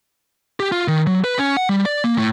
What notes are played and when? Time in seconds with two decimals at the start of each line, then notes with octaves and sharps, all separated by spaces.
0.60 G4
0.72 F4
0.88 D#3
1.07 F#3
1.24 B4
1.39 C#4
1.57 F#5
1.69 G3
1.86 D5
2.04 A#3
2.18 A2